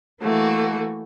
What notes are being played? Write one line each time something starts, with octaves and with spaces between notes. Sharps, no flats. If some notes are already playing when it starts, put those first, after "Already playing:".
E3 A3 A#3 F#4